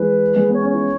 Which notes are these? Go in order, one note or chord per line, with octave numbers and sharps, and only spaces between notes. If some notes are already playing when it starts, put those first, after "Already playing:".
Already playing: E3 G#3 B4
G#3
B3 C#5
C#4
E4 C#5